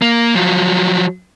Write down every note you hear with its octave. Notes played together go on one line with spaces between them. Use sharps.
A#3
F3 F#3